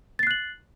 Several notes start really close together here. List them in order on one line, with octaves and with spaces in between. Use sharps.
A6 C7 F#6 F#7